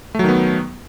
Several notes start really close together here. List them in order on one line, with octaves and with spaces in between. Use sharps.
A3 F#3 D#3 B3